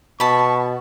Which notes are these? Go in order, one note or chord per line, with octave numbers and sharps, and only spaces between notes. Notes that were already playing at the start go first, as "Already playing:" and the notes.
B2 A5 B5 C#6